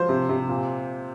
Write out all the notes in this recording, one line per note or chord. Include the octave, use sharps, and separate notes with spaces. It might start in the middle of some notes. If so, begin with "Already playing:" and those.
Already playing: F3 C5
C3
C3
A#2